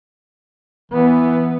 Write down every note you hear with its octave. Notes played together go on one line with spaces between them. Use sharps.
E3 B3